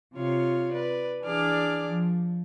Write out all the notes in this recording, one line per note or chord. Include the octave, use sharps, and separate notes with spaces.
C3 F4 C#5 F5
B4 D5
E3 D4 G#4 D5 D6 F6
F3